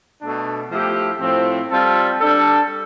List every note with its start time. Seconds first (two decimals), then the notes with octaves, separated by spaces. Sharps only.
0.20 B2 A3 D4
0.70 F3 A3 E4 G4
1.20 A2 F3 C4
1.70 G3 C4 F4 A4
2.20 G3 D4 A4